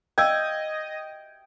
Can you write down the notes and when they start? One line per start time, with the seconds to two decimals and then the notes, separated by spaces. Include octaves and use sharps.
0.18 D5 D#5 F5 G5 E6 G#6